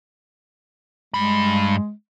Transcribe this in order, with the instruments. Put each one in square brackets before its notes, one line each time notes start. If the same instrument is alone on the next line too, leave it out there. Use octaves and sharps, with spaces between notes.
[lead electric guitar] G2 B5 [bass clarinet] G#3